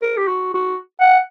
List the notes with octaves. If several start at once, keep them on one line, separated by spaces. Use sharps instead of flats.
A#4
G4
F#4
F#4
F#5